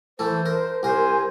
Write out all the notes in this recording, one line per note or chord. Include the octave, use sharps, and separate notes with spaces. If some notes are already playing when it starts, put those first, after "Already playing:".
E3 A3 A4 C5
A#4
C2 A#4 C5 G#5